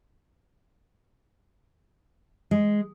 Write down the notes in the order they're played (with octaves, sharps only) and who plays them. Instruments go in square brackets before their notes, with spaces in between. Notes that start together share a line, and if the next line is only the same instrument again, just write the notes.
[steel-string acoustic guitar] G#3